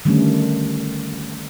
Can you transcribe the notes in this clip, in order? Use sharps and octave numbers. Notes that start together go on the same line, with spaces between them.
D3 D#3 G3 A3 C#4